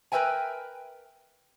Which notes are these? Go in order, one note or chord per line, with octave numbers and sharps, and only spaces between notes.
A#4 B4 C#5 E5 G5 G#5